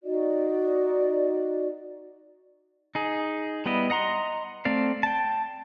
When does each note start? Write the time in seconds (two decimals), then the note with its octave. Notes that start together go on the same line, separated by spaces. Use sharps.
0.04 D#4 F#4 D5 D#5
2.95 D#4 G#4
3.66 G3 B3 E4 D#5
3.90 D#5 F#5 A#5 C6
4.65 A3 C4 D5 F5
5.03 G5 A5